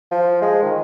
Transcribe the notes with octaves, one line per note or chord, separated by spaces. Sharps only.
F3
G#3
D#3